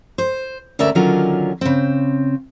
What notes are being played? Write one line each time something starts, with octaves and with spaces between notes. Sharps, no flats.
C5
D2 C#4 A#4 D5 E5
D3 D#3 F#3 C#4 F4 A#4
C#3 C4